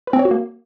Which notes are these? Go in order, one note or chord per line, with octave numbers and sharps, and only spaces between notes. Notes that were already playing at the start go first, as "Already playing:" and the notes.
B4
C4
C#5
F#4
A#3